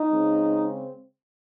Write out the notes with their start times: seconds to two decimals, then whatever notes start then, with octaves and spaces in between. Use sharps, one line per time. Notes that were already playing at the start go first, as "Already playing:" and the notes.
Already playing: D#4
0.10 C#3 G#3 C4